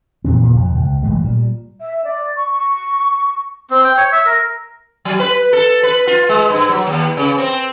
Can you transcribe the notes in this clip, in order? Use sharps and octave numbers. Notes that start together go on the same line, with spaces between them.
F2 A#2 E3 C4
A#2 C#3
F2 B2
C#2
F#1 A2 E3 G#3
A#2 G3
E5
D5
C#6
C#6
C4
G5
C#5
E5
A#4
F#3
B4
A4
B4
F4
G#3
G2
F#3
D#2
C#3
C4